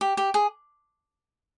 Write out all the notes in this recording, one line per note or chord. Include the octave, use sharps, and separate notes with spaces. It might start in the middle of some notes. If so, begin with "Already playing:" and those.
G4
G4
G#4